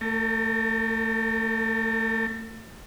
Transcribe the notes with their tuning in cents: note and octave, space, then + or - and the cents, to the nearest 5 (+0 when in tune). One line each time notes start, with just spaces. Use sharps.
A3 +30 A#4 -25